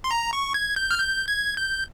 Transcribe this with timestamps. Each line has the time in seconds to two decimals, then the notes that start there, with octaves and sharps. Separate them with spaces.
0.04 C6
0.11 A#5
0.33 C#6
0.54 G#6
0.76 G6
0.91 F6
0.98 G6
1.28 G#6
1.57 G6